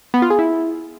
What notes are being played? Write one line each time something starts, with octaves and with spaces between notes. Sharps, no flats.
B3
F4
G#4
E4